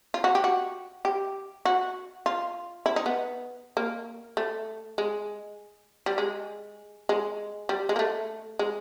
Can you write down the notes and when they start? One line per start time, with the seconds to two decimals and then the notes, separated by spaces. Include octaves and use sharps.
0.14 F4
0.24 F#4
0.35 G4
0.44 F#4
1.05 G4
1.65 F#4
2.26 F4
2.86 E4
2.96 D#4
3.06 B3
3.77 A#3
4.37 A3
4.98 G#3
6.06 G3
6.18 G#3
7.09 G#3
7.69 G3
7.89 G#3
7.96 A#3
7.99 A3
8.59 G#3